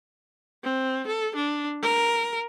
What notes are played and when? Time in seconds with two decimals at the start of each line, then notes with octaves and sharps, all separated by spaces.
0.63 C4
1.07 A4
1.36 D4
1.82 A#4